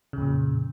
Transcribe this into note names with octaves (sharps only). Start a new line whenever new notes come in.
F2 A#2 C#3